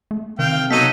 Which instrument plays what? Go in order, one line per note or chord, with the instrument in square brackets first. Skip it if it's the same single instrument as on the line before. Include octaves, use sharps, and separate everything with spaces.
[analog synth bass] A3
[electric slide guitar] C3 [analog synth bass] D#3 [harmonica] F5 G5
[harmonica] F#3 D#4 A4 [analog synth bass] B3 [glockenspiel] B6 D#7